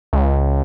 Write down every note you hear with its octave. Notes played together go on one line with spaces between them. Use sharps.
C#2